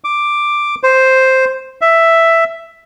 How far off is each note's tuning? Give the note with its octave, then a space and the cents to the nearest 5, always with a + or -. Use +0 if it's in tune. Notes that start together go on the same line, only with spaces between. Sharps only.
D6 +5
C5 +0
E5 +5